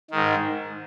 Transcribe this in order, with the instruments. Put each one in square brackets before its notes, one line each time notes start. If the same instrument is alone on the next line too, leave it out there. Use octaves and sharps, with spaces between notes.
[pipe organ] G#2 D#3